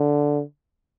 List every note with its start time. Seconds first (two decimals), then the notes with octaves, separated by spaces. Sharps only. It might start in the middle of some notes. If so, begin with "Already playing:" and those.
Already playing: D3